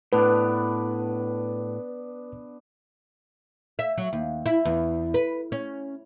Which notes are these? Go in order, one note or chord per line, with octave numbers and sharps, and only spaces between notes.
A2 B3 D4 B4
E5
F#3
D#2
E4
E2
B4
C#4